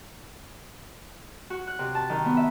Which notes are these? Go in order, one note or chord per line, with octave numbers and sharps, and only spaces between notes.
F#4
F#6
C3
A5
D#3
B3
E5